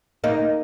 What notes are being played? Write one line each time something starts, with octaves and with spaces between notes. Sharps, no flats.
A#3 D#4